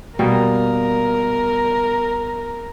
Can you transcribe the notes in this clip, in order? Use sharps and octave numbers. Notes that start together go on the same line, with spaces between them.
B2 G3 A#3 A#4